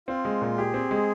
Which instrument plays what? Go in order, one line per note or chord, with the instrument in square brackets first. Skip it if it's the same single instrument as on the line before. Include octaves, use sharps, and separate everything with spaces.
[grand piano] C4 [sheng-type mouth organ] F4
[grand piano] G#3
A#2
[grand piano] G4 [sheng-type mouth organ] G#4
[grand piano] C4
G#3